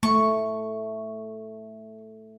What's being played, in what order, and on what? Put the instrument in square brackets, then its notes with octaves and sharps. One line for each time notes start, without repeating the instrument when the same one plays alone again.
[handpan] A3 [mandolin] C#6